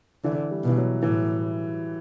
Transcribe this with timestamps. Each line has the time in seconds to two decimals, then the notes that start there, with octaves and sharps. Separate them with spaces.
0.24 D3 E3
0.51 G3
0.64 B2 E3
0.77 F#3
1.02 A2 E3